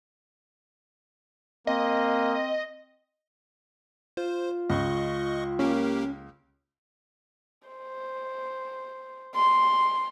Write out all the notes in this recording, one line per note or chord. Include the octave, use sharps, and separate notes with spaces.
A#3 C4 D#5
F4 C5
C#2 D#5 C#6
A#3 C#4 G4 A#4
C5
C6